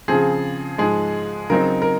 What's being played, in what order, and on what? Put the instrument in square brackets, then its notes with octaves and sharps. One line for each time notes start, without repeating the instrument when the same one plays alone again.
[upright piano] C#3 F3 C4 G#4
G#2 F3 G#3 G#4
C#3 F#3 C4 D#4 A#4
A#4